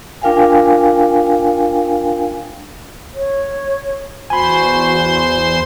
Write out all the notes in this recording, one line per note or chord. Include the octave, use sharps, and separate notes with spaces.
D4 F4 A#4 F5 G5 G#5
C#5
E2 F#4 C5 G#5 B5 C6